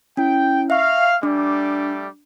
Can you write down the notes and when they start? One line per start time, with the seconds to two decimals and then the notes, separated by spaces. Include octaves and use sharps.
0.17 C#4 E4 G5
0.70 E5 F5 C#6
1.23 G3 A3 D4 D6